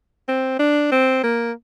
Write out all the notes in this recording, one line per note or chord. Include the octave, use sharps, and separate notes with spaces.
C4
D4
C4
A#3